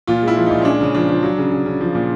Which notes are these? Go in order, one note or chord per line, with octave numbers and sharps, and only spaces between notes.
A#2 F4
G#3
E4
F3
A#2 D#4
C#4
G#3 D4
C#3 C#4
F3 D4
F3
F#3
C#3
C#3
C#3
F3
A#2